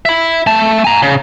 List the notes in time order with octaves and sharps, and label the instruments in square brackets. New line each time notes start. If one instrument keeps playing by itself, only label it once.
[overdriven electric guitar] E5 B5
A3 A5
G#5 A#5
C#3